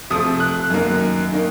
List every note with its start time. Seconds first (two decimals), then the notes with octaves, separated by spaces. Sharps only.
0.10 C3 F3 A3 D#6
0.40 F#6
0.70 F#2 D#3 A#3 D#4
1.32 D#3 A#3 D#4